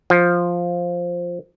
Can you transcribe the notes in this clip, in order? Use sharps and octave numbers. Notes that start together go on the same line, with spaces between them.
F3